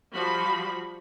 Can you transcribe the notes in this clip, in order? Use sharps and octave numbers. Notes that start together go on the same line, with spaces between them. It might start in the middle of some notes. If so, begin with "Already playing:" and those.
F3 G3 F#4 B5